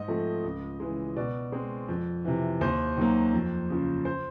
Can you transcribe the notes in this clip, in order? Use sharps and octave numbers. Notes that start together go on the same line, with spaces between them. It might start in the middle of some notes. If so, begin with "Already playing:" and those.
Already playing: G#2 D#5
F3 A3 C4
C#2
C#3 E3 G#3
B2 D5
G#3 C4
F2
C3 E3
D#2 C5
D#3 F#3 A#3
F2
C#3 F3
C5